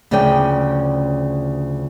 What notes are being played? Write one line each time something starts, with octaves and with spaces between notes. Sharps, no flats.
D2 C#3 F3 C#4 D5 G5